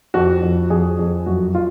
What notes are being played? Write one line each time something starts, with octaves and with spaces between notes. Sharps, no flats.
F2 F#4
F2
F2 G#4
F2
F#2 F#4
F4